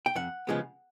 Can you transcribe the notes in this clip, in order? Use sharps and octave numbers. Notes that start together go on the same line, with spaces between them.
G5
F2 F#5
C#3 F3 G#3 B3